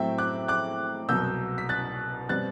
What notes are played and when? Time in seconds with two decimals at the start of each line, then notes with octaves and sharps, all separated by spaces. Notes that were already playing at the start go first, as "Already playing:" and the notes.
Already playing: A2 F#3 C4 E4 E5 G5
0.18 D6 F#6
0.48 D6 F#6
1.09 C2 B2 F#3 E6 G6
1.58 B6
1.69 F#6 A6
2.29 B2 G3 C4 F#6 A6